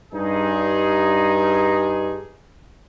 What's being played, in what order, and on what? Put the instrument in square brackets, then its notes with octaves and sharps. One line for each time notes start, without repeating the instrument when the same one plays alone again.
[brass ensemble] G2 D#4 G#4